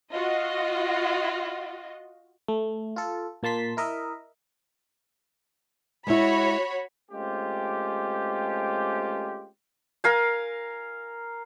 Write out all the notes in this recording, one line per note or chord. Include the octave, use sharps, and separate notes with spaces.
F4 F#4 D#5
A3
F4 A4
A#2 A#3 A5 C6 B6
E4 A#4 D#5 E5
G#3 E4 F#4 C#5 B5
G#3 A3 C4 C#4 F4 G4
A#4 F5 G#5